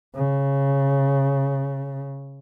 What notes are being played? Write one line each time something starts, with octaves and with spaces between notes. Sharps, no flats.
C#3